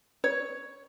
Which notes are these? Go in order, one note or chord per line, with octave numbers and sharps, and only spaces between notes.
C#5